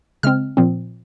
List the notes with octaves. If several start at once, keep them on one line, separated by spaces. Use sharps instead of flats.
C#3 G#3 C4 F6
A#2 F3 C4